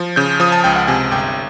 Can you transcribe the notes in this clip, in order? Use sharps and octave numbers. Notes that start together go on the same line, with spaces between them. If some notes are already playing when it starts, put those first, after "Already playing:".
Already playing: F3
C#3 G6
F3 D#6
A5
C#2 G5
F#5
C3 G#5
G1 G5